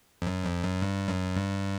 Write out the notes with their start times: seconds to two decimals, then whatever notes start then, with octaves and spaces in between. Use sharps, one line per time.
0.22 F2
0.27 F#2
0.44 F2
0.63 F#2
0.82 G2
1.08 F#2
1.36 G2